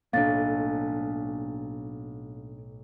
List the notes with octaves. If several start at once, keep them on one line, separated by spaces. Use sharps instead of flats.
B1 A2 A#3 C#4 D4 F5 A6